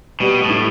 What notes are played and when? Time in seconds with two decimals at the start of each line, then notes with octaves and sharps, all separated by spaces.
0.20 B2 G3
0.43 A2
0.50 E4